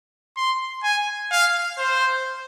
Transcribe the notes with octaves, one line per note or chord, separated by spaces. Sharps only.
C6
G#5
F5
C5